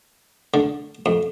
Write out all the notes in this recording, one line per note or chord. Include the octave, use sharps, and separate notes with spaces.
D3
F2